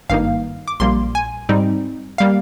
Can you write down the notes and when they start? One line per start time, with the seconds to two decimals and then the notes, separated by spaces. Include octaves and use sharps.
0.10 G#1 G2 D#3 A#3 D#4 F5
0.68 D6
0.80 A#1 A#2 G3 A#3 C6
1.15 G#5
1.49 G#2 G3 C4 D#4
2.18 G3 A#3 F5